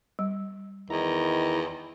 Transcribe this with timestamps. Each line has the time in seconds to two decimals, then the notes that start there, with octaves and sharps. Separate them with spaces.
0.19 G3
0.90 E2 D#3 E4 A#5